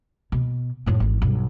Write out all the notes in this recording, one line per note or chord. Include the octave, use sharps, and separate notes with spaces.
B2
F#2 A2
G#1 E3
B1 G2